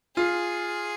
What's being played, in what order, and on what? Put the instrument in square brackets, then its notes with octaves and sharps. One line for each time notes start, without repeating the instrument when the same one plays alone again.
[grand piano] F4 [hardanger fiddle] G#4